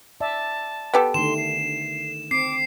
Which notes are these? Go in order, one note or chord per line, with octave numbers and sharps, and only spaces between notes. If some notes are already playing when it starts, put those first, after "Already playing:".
D5 E5 A5
B3 G4 A4
D3 D#3 A3 C6 E7
C7
C4 D6 C7